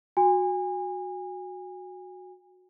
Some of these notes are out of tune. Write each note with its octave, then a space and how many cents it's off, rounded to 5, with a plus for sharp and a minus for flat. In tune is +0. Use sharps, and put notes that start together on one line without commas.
F#4 -15 G#5 -30